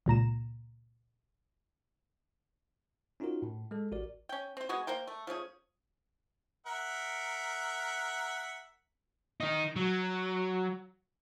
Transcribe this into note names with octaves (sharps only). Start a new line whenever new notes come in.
C#2 A#2 A#5 E7
C#4 D#4 F4 F#4 A#4
A2
G#3 A4
A1 F#4 A#4 D5
C#4 G5
C4 C5
G#3 B3 F#4 G#4
A#3 A#4 C5 G5
A3
F3 A3 C#4 G#4
A#4 E5 F#5
D#3 D#4
F#3